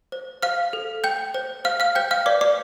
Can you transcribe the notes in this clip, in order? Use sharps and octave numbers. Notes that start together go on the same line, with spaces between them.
C5
C5 F5 F6
A4
G5 G6
C5
C5 F5 F6
F5 F6
C5 G5 G6
F5 F6
B4 D5 D6
D5 D6